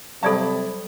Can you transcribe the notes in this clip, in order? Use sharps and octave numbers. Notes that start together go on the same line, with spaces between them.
C3 F#3 G3 A4 D5 F5 A5 B5